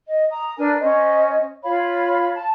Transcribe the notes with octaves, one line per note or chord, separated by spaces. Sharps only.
D#5
A#5 D#6
D4 A#4 B4 G#5
C#4 C5 D#5
F4 C#5 F5 B5
A5